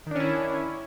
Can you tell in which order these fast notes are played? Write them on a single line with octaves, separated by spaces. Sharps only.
D#3 D4 C#4 E4